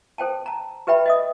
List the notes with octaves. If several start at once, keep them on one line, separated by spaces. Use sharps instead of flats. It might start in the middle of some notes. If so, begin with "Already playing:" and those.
A4 C5 G5 A5
A5 A#5
G4 B4 E5 G5 B5
D#5 E5 D#6